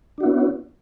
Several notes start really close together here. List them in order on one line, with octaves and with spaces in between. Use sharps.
D4 F#4 E4 B3 C#4